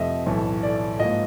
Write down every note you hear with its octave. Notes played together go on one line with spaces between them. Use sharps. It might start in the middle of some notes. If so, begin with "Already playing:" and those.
Already playing: F2 C3 F3 A3 C4 D#5 E5
B1 A2 E3 A3
D5
G#2 F3 A#3 D#5